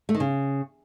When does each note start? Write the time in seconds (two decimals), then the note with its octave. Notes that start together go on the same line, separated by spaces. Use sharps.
0.09 A3
0.14 D#3
0.20 C#3